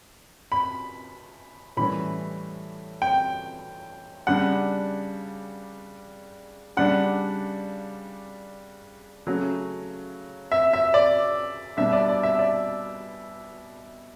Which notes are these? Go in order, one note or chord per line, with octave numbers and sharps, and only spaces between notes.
B5
A2 E3 G3 C#4 B5
G5
C#3 G3 D4 F#5
C#3 G3 D4 F#5
C#3 F#3 A3 C#4
E5
E5
D5
B2 G3 D4 E5
D5
D5
E5
D5